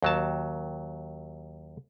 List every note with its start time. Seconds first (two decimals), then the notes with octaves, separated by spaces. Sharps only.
0.03 D#2 F#3 A5